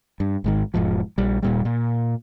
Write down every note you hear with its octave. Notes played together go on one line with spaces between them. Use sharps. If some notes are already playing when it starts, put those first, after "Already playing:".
G2
G#1 G#2 D#3
E1 G#2 F3
A#1 G3
D#1 A#2 G3
A#2